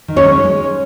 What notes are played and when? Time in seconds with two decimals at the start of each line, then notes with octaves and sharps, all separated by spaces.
0.08 D#3
0.16 C#4 C#5
0.25 G#3
0.44 G#3